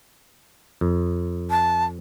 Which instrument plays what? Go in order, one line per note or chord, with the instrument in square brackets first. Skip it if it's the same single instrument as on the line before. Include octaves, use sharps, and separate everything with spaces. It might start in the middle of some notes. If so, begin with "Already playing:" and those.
[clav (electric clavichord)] F2
[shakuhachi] A5